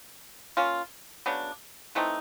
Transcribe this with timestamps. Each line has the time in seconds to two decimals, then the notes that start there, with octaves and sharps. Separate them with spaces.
0.57 A#3 C#4 F4
1.26 C#3 F#3 B3 D4
1.95 E3 A3 C4 D#4